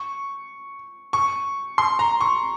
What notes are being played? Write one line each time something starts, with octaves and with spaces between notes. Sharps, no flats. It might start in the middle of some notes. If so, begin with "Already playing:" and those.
Already playing: C#6
C#6
C6
A#5
C#6